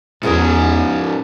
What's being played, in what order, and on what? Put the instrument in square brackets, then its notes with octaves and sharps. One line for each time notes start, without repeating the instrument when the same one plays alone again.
[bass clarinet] E2 [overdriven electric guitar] G#2 C#4 [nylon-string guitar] E4 G#4 A#4